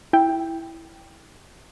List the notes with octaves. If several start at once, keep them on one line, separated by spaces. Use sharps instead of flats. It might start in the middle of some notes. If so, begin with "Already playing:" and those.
E4 G5